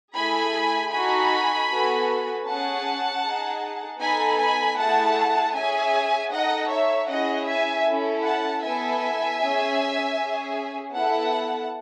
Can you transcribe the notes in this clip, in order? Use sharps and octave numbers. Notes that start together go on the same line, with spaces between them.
A3 E4 G#4 G#5 B5
D#4 F#4 A4 G#5 B5
B3 F#4 A4
C#4 G#4 F#5 A5
D#4 G#4
B3 D#4 A4 G#5 B5
G#5 B5
A3 E4 G#4 F#5 A5
C#4 G#4 E5 G#5
D#4 A4 D#5 F#5
C#5 E5
C#4 E4 G#4 D#5 F#5
E5 G#5
C#4 E4 A4
F#5 A5
B3 E4 A4 E5 G#5
C#4 G#4
C#4 G#4
B3 E4 A4 F#5 A5